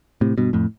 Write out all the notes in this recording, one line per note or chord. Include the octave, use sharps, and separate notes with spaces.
A2 C3
G2 B2
F2 A2